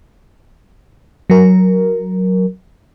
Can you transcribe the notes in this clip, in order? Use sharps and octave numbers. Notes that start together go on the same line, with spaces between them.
F#3 A#4